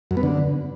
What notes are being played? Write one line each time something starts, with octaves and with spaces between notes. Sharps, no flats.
F#2
B3
D3